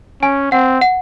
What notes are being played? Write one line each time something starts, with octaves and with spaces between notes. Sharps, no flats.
C#4 G#5
C4 F#5
F#5